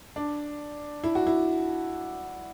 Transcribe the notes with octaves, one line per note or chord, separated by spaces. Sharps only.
D4
E4
F#4
E4